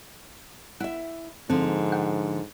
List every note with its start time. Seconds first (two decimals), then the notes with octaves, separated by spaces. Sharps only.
0.80 E4 E5 F#5
1.50 G#2 D3 F3 C4
1.92 F#5 G5